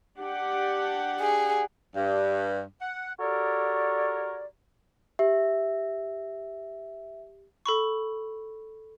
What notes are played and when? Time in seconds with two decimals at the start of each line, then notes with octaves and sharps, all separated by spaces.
0.17 D4 G4 F#5
1.20 G#4
1.96 G2
2.82 F#5
3.19 F#4 G4 A4 A#4 C#5 D5
5.19 G4 E5
7.66 A4 B5 C#6